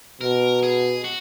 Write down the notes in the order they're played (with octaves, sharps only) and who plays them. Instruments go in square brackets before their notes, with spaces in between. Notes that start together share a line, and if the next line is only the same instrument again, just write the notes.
[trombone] B2 [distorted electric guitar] A#4
[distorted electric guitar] G#4
F#4